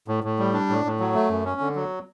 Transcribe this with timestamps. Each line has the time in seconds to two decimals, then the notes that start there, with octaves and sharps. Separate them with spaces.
0.08 A2
0.24 A2
0.39 G3
0.53 D4
0.69 A2
0.85 A2
1.00 F#3
1.15 A3
1.30 F#2
1.45 C#4
1.61 D3
1.75 F#3